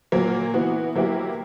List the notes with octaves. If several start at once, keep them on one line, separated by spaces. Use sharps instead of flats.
A#2 F#3 A#3
E3 B3 F#4
F#3 A#3 E4 G4